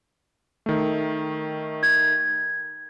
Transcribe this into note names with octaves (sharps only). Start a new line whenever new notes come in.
D#3 A3
G#6